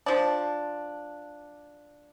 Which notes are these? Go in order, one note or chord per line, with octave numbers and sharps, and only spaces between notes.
F3 D4